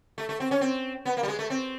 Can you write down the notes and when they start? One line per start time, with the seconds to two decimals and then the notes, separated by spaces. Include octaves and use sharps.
0.18 A3
0.29 A3
0.40 C4
0.51 C#4
0.61 C4
1.05 B3
1.17 A#3
1.23 G3
1.28 G#3
1.39 A3
1.50 C4